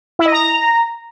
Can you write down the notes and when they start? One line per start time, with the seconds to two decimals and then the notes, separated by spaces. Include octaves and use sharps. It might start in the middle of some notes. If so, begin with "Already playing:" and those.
0.19 E4
0.26 D#5
0.32 A#5